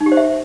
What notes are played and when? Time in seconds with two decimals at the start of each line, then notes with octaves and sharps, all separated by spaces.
0.01 D#4
0.06 G4
0.12 C5
0.17 E5